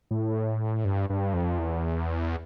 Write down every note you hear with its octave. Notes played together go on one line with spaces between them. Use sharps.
A2
G2
G2
F2
E2